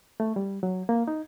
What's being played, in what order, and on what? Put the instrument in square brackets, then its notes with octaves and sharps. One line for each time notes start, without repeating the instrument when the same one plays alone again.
[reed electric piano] A3
G3
F#3
A#3
D#4